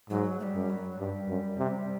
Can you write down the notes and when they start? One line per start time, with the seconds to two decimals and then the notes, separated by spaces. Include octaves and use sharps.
0.10 G#2 F#3
0.40 A3
0.43 G3
0.55 F#2
0.70 F#3
0.99 G2 G3
1.28 F#2
1.58 C3